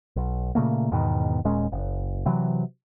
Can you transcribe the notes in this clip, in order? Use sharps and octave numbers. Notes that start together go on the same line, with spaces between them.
B1
A#2 C#3 A3 A#3
E2 G#2 B2 D#3
D#1 A#2 G#3 C#4
F#1
C3 E3 F#3